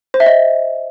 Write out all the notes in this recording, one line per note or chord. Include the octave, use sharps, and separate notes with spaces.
C5
E5
D#5